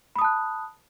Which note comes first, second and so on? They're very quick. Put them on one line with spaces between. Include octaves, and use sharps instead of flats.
B5 D#6 A5 F#6